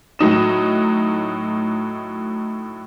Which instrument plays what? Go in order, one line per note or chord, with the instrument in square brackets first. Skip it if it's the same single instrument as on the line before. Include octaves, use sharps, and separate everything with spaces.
[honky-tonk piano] A2 F#3 D#4 E7